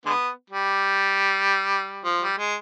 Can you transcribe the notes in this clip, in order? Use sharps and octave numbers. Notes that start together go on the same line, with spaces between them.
D3 G#3 B3
G3
F3
G3
G#3